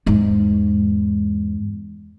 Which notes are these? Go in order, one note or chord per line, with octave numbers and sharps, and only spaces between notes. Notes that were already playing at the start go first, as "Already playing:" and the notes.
E2 G#2